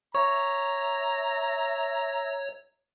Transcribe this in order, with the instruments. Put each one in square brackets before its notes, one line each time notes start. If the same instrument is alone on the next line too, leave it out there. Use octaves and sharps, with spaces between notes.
[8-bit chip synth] C#5 [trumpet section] E5 A#5 [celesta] C#6